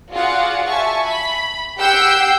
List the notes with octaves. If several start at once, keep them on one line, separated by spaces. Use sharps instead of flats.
F4 F#4 G#4 D5 F5 F#5
E5 G#5 A5 C#6
B5
G4 F#5 G5 E6 G6 C7